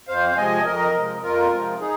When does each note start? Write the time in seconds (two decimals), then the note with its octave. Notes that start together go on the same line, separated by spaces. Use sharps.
0.08 F2 C5 F5
0.32 F5
0.36 C3 F3 G#3 D#5 G#5
0.65 F2 A#4 D#5
0.94 C3 F3 G#3
1.22 F2 F4 A#4
1.51 C3 F3 G#3
1.79 D#4 G#4